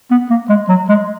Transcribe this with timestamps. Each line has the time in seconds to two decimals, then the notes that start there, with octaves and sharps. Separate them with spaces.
0.11 B3
0.30 A#3
0.49 G#3
0.69 F#3
0.89 G#3